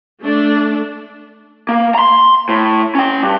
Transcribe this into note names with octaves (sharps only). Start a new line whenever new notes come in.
A3 D4
A#3
A#5 C6
A2
C#4 G5
G2